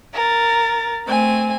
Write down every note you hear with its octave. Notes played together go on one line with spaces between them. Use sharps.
A#4 A6
A3 C4 G#5